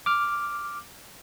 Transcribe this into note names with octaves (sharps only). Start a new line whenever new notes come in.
D6 F6